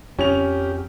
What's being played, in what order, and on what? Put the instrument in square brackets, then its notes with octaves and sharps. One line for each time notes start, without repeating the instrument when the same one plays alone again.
[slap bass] F2 [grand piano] C#4 F7 [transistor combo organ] G4